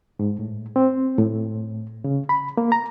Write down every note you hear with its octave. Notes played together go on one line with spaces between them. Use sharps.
G#2
A2
C4
A2
C#3
B5
A#3
A#5